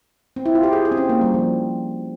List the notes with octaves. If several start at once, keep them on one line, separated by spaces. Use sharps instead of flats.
C4
E4
F4
G4
G#4
G#4
C4
C#4
A#3
G3
F3